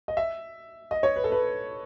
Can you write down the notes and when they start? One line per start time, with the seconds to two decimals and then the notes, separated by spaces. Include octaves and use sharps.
0.08 D#5
0.17 E5
0.91 D#5
1.03 C#5
1.16 B4
1.24 A4
1.32 B4